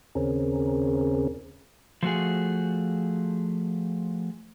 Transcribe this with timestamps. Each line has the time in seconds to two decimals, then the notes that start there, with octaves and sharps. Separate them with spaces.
0.15 D#2 C#3 C4 C#4 G#4 A#4
2.03 F3 A3 F#4 G#4